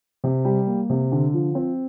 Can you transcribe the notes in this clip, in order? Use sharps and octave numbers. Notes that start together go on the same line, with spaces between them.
C3
G3
A#3
C3
D3
F3
C4